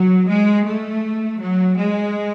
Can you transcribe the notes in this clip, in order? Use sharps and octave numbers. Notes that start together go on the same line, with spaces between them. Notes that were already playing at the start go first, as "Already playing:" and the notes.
Already playing: F#3
G#3
A3
F#3
G#3